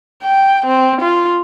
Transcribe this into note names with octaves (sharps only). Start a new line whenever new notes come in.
G5
C4
F4